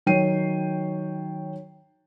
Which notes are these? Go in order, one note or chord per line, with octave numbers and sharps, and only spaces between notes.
D#3 F#3 C#5 G5 C7 D#7